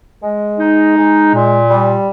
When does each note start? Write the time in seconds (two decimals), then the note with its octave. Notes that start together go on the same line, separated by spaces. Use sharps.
0.22 G#3
0.59 D#4
0.96 G#3
1.33 A#2
1.69 G3